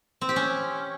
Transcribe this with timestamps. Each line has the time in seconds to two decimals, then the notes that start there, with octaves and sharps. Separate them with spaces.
0.21 C4
0.29 G4
0.36 C#4